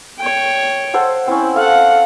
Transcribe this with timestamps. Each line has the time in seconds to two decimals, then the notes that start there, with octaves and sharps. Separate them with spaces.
0.19 C#5 G5
0.94 A4 C5 F#5
1.27 C4 C#4 E4
1.56 A4 F5 F#5